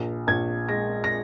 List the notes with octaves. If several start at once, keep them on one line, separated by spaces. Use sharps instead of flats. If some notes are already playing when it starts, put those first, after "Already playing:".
Already playing: A#1
A#1 G#6
G#3 A#6
A#6